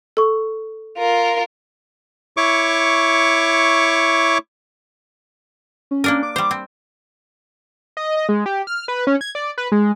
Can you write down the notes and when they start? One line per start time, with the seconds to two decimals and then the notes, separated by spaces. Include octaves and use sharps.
0.17 A4 C#6
0.98 F4 A#4
2.37 E4 C#5 C#6 D6
5.91 C#4
6.04 A#3 D4 A#4
6.23 D6
6.36 G3 C5
6.51 C4
7.97 D#5
8.17 D#5
8.29 G#3
8.46 G4
8.67 F6
8.88 B4
9.07 C#4
9.21 G#6
9.35 D5
9.58 B4
9.72 G#3